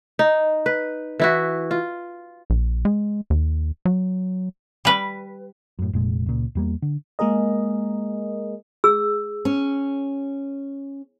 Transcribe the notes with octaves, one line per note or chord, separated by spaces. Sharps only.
D#4
B4
E3 E4 F#4
F4
A#1
G#3
D#2
F#3
G3 B4
F#2 A2
F1 A#2 G#3
C#2 A#2
E2 G3 A#3
D3
G#3 A#3 G#4 A#4 D#5
G#4 E6
C#4